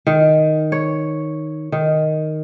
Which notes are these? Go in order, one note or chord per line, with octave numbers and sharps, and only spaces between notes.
D#3
C#5
D#3